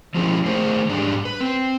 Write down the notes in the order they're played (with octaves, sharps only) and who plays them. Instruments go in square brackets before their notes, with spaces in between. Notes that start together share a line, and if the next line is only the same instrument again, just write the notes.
[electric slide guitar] F3 F#3 G#3 C4 C#4 E4
D#3 A3 G#4 C5
G#2 G3 G#3 D4
B4
C4